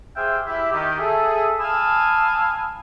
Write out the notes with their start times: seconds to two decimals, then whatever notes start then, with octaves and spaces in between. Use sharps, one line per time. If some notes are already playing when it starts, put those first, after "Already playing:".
0.17 G4 G#4 C5 E5 F5 G5
0.47 E4 G4 E5
0.72 D#3 G4
0.99 G#4 A4 E5
1.60 F5 G#5 A5 B5 D#6 E6